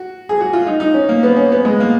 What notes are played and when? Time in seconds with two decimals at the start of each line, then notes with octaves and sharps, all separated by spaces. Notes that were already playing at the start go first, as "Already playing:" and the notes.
Already playing: F#4
0.29 G#4
0.41 F#4
0.53 F4
0.67 D#4
0.80 D#4
0.94 C#4
1.09 A#3
1.23 B3
1.36 C#4
1.52 B3
1.65 G#3
1.80 A#3